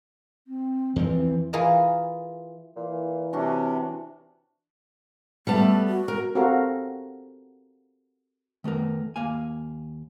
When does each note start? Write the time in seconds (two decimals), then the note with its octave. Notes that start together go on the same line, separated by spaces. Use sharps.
0.47 C4
0.96 E2 E3 F3 C4
1.53 E3 F4 G#4 A#4 G#5 A5
2.76 A#2 E3
3.33 C3 C#4 D4 F#4 C6
5.47 G3 A3 B3 A5
5.88 F#4
6.08 A#4
6.35 C4 F#4 G4 A4 A#4 F5
8.64 D#3 A3 B3 A#4
9.16 D#2 A#3 F5 G#5